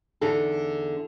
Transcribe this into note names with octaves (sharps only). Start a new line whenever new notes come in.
E2 D3 D#4 A4